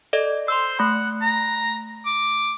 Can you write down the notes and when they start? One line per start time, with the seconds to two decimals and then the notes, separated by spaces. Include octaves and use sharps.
0.13 A4 D5 D#5
0.48 C5 C6 E6
0.79 A3 F#5 B5
1.22 A#5
2.05 D6